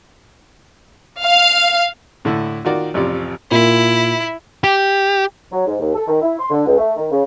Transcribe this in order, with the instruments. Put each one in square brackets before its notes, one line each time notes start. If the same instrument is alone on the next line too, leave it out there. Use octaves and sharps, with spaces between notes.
[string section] F5
[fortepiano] A2 D3 E4
D#3 F4 F#4 A#4 D5
A1 F2 C3 F4 D5
[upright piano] A#2 [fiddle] E4
[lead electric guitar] G4
[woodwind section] F#3
G#2
D#2
A4
D#3
E4
C6
D3
C#2
A3
D#3
C#3